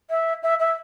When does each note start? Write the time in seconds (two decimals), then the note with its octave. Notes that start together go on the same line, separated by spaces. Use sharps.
0.10 E5
0.42 E5
0.59 E5